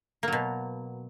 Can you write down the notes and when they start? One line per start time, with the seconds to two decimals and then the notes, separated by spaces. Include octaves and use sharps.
0.23 A#3
0.28 F#3
0.32 B2